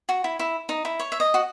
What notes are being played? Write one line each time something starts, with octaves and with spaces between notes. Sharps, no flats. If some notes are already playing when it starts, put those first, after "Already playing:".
F#4
E4
E4
D#4
E4
C#5
E5
D#5
F#4